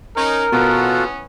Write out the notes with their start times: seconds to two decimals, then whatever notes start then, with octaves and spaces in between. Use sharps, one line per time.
0.17 C#4 D#4 A#4
0.52 B2 E3 B3 C#4 F4 F#4 A4